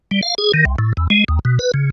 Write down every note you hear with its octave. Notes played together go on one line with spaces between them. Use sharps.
G3
F5
G#4
D#3
C2
A2
E2
G#3
D#2
B2
B4
C#3